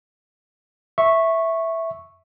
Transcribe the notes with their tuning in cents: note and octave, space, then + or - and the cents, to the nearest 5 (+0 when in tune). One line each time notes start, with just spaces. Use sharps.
E5 +0 C#6 -10